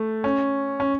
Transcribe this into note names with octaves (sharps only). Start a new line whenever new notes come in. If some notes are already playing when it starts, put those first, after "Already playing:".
Already playing: A3
C#4
C#4